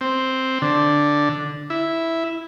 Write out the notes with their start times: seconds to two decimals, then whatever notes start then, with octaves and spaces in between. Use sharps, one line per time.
0.01 C4
0.62 D3
1.70 E4